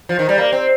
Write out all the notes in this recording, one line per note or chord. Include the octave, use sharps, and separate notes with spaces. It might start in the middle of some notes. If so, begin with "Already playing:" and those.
F3
D#3
G3
A#3
C4